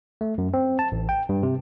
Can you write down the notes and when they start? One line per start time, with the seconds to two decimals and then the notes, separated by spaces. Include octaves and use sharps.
0.21 A3
0.38 F#2
0.54 C4
0.79 A5
0.92 A1
1.09 G5
1.29 G2
1.43 C3